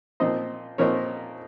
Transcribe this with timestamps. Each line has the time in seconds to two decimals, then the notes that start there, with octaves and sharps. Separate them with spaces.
0.20 A#2 F3 C4 D#4 C5 D#5
0.78 A#2 F3 C4 D#4 A#4 C#5